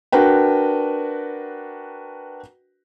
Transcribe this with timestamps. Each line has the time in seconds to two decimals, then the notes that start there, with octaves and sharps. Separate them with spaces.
0.12 D4 F#4 A#4 B4 G5